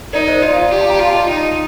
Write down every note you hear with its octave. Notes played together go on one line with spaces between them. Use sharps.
D#4 A#4 D5
C5 D#5
F4 D5 F5
D5 F5
G4
F5 A5
G5 A#5
F4 F5 A5
D#5 G5
D#4